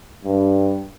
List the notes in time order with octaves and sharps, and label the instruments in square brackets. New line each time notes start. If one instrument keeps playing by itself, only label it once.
[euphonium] G2